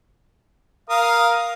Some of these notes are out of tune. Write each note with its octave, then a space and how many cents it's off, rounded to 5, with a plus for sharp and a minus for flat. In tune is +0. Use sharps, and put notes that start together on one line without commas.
A#4 +10 F5 +0 D#6 +0